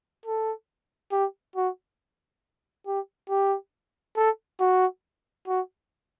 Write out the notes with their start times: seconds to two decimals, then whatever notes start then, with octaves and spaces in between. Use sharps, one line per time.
0.26 A4
1.11 G4
1.56 F#4
2.87 G4
3.29 G4
4.17 A4
4.60 F#4
5.47 F#4